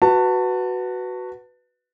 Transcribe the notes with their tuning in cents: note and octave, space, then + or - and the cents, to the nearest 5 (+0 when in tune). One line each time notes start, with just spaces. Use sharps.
F#4 +0 B4 +0 A5 +25